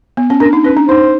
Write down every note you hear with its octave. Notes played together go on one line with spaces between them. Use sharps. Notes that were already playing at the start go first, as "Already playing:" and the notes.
B3
C#4
D4 A#4
D#4
C#4 B4
D4
D#4 C5